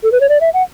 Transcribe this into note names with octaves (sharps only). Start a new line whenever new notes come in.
A4
B4
C#5
D5
E5
F#5